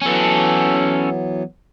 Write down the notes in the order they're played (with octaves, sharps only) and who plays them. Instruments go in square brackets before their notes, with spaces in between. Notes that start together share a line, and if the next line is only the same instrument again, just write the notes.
[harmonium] E3 F#3 B3 [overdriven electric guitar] C#4 A4